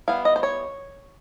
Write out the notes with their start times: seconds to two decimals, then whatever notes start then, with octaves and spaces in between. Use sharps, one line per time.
0.08 G3 B3 E4 F5
0.25 D#5
0.36 C5
0.43 C#5